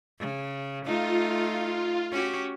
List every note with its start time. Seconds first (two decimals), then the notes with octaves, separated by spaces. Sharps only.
0.19 C#3
0.85 A3 D#4 F4
2.11 C#4 F#4 G4